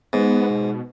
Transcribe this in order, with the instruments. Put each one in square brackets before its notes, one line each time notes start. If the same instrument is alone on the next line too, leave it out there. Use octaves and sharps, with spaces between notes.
[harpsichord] G#2 [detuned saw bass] B3
[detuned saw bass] B2